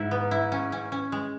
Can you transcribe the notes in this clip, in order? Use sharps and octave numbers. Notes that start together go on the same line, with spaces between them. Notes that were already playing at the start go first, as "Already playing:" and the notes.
Already playing: G#2 E4
B3
E4
C#4
C#4
C#4
G#3